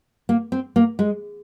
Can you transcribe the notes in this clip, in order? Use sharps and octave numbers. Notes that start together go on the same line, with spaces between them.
A#3
C4
A#3
G#3